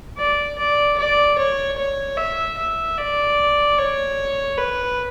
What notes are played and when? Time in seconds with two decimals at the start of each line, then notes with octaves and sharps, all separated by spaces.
0.18 D5
0.58 D5
0.97 D5
1.38 C#5
1.78 C#5
2.18 E5
2.58 E5
2.98 D5
3.78 C#5
4.58 B4